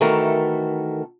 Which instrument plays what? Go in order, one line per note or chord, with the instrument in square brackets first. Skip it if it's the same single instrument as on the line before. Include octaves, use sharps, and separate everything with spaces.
[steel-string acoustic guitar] D#3 E3 A3 F#4 A4 A#4